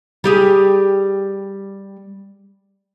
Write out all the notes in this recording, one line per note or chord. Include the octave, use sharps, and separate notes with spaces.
G3 G4 G#4